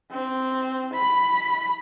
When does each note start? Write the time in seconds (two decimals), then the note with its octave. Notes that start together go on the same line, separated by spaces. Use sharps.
0.12 C4
0.93 B5